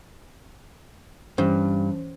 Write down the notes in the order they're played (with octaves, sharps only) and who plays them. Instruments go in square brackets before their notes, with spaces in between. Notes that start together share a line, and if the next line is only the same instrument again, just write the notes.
[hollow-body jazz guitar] G2 [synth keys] E3 C#4 C5